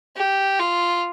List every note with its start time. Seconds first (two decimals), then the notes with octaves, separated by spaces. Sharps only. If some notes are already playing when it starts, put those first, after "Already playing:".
0.17 G4
0.60 F4